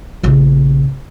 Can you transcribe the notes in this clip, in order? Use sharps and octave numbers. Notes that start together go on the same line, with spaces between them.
A#1 C#3